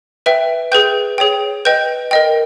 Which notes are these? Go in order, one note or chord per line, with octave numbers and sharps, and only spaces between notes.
B4 E5 G5
G#4 B4 G5 G6
G#4 C#5 G5
B4 D#5 G5 G6
A#4 D#5 G5